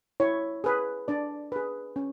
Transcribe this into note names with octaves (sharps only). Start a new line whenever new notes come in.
E4 C#5
G#4 B4
D4 D5
G#4 B4
C#4